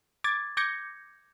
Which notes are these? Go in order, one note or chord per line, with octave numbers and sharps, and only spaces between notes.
D6 G#6 A6
D6 G6 G#6 A#6 C#7